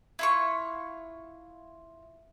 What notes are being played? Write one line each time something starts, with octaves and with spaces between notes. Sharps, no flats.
E4 F4 C#6